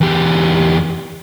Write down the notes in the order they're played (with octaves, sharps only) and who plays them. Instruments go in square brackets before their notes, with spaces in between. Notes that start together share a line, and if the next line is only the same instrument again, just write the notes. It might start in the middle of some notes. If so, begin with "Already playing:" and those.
[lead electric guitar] E2 G4